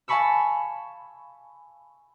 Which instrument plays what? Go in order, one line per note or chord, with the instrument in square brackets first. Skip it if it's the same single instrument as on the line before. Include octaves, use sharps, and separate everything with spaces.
[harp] F5 G#5 A5 B5 C#6 E6